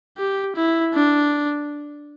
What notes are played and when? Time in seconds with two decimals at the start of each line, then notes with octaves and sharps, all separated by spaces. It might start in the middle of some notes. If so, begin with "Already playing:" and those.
0.17 G4
0.56 E4
0.94 D4